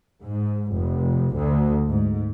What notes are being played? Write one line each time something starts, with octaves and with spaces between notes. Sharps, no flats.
G#2
F1
D2
G#2